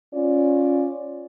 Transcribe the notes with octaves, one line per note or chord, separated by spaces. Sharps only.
C#4 F4 D5